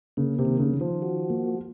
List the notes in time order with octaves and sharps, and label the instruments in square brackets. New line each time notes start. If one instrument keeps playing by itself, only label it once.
[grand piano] C#3 [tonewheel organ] A#3
[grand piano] C3
[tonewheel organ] D#3
[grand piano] C#3
[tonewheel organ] D#3
[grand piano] F3
[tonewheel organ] F#4
A#3